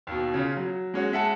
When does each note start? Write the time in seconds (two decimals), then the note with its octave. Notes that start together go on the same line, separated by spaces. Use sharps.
0.07 D#2 B2
0.34 C#3 F4 C#5
0.57 F#3
0.94 G#3 C#4 F#4
1.12 G#3 E5 F#5 A5